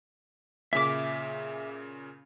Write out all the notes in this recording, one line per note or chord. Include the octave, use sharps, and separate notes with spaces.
A#2 C#3 E5 D6